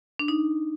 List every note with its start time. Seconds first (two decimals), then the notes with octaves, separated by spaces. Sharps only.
0.19 D4
0.28 D#4